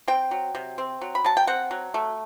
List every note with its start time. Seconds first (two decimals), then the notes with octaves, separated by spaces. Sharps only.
0.08 C4 G5
0.31 F#3
0.55 C3
0.78 C4
1.01 F#3
1.15 B5
1.24 F#3 A5
1.37 G5
1.47 C4 F#5
1.71 F#3
1.94 A3